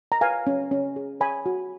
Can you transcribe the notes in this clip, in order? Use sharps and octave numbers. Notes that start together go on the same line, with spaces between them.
A#5
B4 F5 G#5
C#4
C#4
G#4
C#5 G#5 B5
F#4